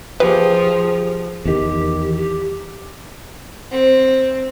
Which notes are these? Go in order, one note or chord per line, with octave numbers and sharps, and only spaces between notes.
F3 G4 G#4 B4 D#6
E2 D#3 G4
G4
C4